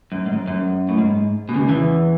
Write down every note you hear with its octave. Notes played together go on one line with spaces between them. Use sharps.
F#2
G#2
F#2
F#2
A2
G#2
B2
C#2 C#3
E2 E3